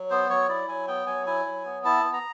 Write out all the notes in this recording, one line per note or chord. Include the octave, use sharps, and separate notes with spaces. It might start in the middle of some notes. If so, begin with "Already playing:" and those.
Already playing: F#3
B3 C5
F#3 C#5
E4 D5
F#3 G#5
B3 G5
F#3 G#5
E4 G#5
F#3
B3
E4 A5
B3
A#5